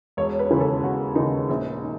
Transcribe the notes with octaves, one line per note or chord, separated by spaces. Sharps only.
E1 C#5
B4
D#2 C#3 E3
A4
E1 F#4
D#2 C#3 E3 D#4
A#1
D#3